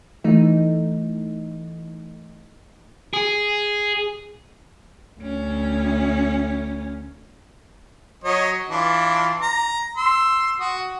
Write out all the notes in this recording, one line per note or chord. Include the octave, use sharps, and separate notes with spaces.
E3 A3 D#4
G#4
D2 C#4
F#3 C#5 D#5
E3 D4 F4
A#5
C6 E6
F#4 D#6